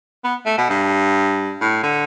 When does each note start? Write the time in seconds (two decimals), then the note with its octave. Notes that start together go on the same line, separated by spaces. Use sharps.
0.24 B3
0.46 A3
0.58 B2
0.70 G2
1.61 A2
1.84 D3